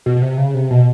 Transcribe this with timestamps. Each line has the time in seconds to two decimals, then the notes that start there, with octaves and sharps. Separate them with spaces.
0.06 B2
0.16 B2
0.22 C3
0.38 C#3
0.54 C3
0.70 B2